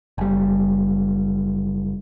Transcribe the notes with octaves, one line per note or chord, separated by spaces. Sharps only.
F#1 G3